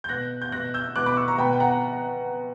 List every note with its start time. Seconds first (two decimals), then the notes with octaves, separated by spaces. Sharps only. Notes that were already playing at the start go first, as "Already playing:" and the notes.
0.04 G6
0.09 B2 F#6 A#6
0.42 G6
0.52 B2 F#6 A#6
0.74 E6 G6
0.96 B2 D6 F#6
1.06 B5 D6
1.16 C#6 E6
1.28 A#5 C#6
1.38 B2 G5 B5
1.53 G5
1.60 F#5 A#5